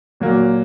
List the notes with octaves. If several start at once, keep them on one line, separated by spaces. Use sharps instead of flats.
A#2 F#3 A#3